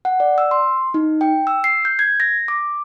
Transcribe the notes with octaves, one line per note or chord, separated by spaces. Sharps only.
F#5
D5
E6
C6
D#4
G5
E6
C7
G6
G#6
A#6
D6